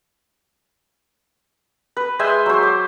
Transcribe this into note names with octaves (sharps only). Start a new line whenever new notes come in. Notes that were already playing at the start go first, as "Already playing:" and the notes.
B4
G#3 C5 E5 G#5
F#3 C5
D6